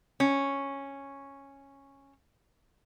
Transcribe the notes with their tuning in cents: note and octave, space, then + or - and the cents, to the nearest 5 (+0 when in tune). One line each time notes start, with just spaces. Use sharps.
C#4 -5